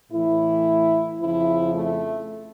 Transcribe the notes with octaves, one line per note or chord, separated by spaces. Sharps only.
A2 E3 E4
F2 C#3 F3 E4
A3